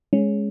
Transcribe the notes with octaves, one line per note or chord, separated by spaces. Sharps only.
G#3 C#4